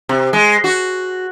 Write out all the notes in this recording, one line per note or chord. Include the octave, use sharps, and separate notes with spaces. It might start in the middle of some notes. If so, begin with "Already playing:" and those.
C3
G#3
F#4